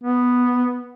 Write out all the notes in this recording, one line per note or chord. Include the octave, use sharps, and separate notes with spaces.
B3